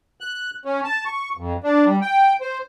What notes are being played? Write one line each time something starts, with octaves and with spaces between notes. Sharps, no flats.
F#6
C#4
A5
C#6
F2
D4
G3
G5
C5